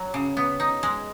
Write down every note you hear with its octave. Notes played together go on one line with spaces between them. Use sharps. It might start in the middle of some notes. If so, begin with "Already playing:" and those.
Already playing: F#3
C#3
B3
D#4
G#3